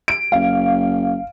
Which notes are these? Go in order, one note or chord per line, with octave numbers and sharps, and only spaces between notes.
D7
F#1 F5